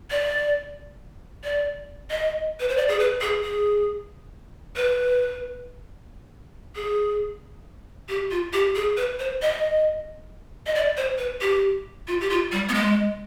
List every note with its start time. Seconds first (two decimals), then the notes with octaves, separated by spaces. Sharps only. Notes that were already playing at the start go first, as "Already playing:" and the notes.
0.11 D5
1.44 D5
2.11 D#5
2.60 B4
2.69 C5
2.77 D5
2.88 G#4
2.99 B4
3.21 G#4
3.44 G#4
4.76 B4
6.76 G#4
8.09 G4
8.31 F4
8.53 G4
8.75 G#4
8.97 B4
9.19 C5
9.42 D#5
10.67 D#5
10.75 D5
10.97 C5
11.18 B4
11.41 G4
12.08 F4
12.21 G4
12.30 F4
12.52 G3
12.69 B3
12.74 G#3